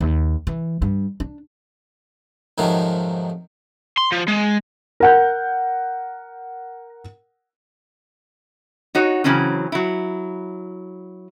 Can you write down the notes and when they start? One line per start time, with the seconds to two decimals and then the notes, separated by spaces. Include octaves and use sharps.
0.01 D#2
0.47 E3
0.82 G2
1.20 D4
2.58 F2 G#2 C3 D#3 F3 F#3
3.97 C6
4.12 F3
4.28 G#3
5.00 A#4 F#5 G6
8.95 D#4 F#4 C#5
9.24 C#3 E3 F#3 C4 C#4
9.72 F#3 E4